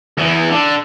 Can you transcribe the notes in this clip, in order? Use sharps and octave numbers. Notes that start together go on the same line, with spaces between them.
E2 E3
D3